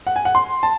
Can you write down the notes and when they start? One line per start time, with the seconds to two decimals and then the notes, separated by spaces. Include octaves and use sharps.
0.07 F#5
0.16 G#5
0.25 F#5
0.35 C6
0.63 A5